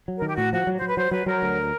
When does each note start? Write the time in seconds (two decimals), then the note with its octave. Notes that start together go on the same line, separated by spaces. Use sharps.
0.08 F#3
0.17 D#3 A#4
0.27 G4
0.37 A2 F#4
0.53 F3 F#4
0.67 F#3
0.78 F#3 C5
0.87 B4
0.97 F#3 C5
1.11 F#3 B4
1.26 F#3 A#4
1.42 D2